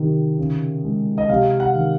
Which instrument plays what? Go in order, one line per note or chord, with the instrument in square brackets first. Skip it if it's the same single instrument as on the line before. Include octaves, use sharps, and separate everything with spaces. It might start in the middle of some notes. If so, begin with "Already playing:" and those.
Already playing: [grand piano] C3 D#3
C#3
G#3
D#5
C3 F5
F#5
D#3